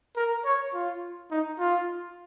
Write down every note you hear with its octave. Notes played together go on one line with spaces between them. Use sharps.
A#4
C#5
F4
D#4
F4